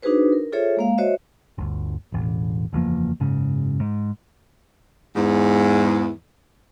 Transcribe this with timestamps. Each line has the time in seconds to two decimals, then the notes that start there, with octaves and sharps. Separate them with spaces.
0.02 D4 D#4 F#4 G#4 B4 C5
0.32 A#4
0.52 F4 G#4 A4 C5 C#5 E5
0.77 G#3 A#3 F5
0.98 F#4 C5 C#5 D#5 E5
1.58 G1 D2
2.12 E1 A1
2.72 F#1 E2 F3 A#3
3.20 F#1 G#2 C#3
3.80 G#2
5.15 E2 G#2